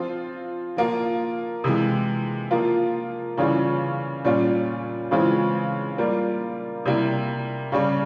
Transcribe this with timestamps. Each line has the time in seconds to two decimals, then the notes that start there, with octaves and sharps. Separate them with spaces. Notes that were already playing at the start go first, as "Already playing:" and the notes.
Already playing: F3 C4 F4
0.77 F3 A#3 F4
1.64 C3 E3 G#3
2.51 F3 A#3 F4
3.37 C#3 E3 G3 C#4 F4
4.24 A#2 G3 C#4 F4
5.11 C#3 E3 G#3 C4 F4
5.98 G3 A#3 F4
6.85 C3 G3 A#3 E4
7.72 C#3 G3 C#4